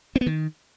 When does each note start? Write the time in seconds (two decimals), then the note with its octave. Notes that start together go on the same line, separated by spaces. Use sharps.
0.16 C4
0.21 B3
0.26 D#3